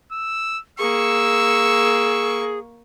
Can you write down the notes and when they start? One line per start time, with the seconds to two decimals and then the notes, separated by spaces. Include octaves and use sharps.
0.12 E6
0.79 A#3 G#4 C#6 E6